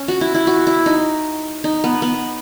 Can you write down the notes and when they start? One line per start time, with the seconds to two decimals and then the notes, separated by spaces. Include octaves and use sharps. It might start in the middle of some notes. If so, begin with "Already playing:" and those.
Already playing: C#4
0.08 F#4
0.21 E4
0.35 E4
0.47 F#4
0.67 E4
0.86 D#4
1.64 D#4
1.84 B3
2.02 B3